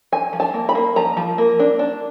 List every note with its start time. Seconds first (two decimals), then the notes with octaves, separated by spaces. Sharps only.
0.12 F3 G#5
0.33 F3
0.40 A5
0.54 A#3
0.69 B5
0.75 A#3
0.96 F3 A#5
1.17 F3
1.38 A#3
1.59 D4
1.79 D4